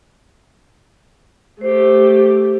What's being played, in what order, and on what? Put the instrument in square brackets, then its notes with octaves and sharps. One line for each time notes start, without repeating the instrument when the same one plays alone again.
[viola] A3 G4 [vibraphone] C5